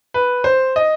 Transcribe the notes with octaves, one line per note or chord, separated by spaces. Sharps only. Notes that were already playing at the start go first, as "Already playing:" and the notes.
B4
C5
D#5